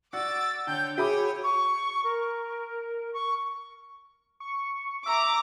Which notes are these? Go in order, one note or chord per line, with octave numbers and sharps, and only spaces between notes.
F#4 D5 F#5 D6 E6 A6
D3 C#5 G5 G6
F#4 G#4 C#5 E5 B5 D6 D#6
C#6
A#4
C#6
C#6
E5 A#5 D6